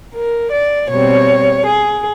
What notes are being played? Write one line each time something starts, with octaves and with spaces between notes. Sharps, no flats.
A#4
D5
B2 G3 C4 C#5
G#4